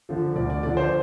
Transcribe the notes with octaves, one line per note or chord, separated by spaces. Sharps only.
D3 F3
D2 D5
D5
D3 F3 D5
C5